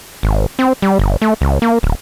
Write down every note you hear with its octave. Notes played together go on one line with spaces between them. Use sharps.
G#1
C4
G3
G1
A3
C#2
A#3
D1